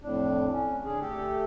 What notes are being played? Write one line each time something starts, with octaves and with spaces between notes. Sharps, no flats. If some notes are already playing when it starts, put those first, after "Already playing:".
F2 A2 D4
C#4
D3 G#4
A3 G4 A4